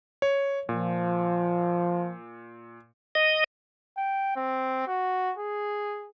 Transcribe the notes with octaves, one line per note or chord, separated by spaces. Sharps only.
C#5
A#2 F3
D#5
G5
C4
F#4
G#4